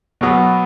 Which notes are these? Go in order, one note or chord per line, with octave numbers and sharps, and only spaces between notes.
B2 F#3 B3